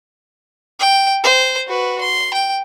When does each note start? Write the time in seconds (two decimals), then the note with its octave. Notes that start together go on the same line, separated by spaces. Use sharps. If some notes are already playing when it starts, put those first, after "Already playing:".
0.80 G5
1.24 C5
1.67 F#4 B4
2.01 C6
2.34 G5